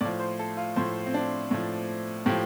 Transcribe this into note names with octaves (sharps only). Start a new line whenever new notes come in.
A2 F3 D5
C5
A4
F4
A2 F3 C5
C4
D4
A2 F3
A2 F3 G4